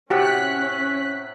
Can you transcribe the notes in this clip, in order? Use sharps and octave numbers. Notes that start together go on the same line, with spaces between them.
A2 C3 C#4 F#4 G4 F#5 F#6 B6